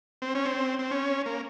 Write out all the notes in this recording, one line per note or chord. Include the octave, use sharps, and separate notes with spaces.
C4
C#4
C4
C4
C#4
A#3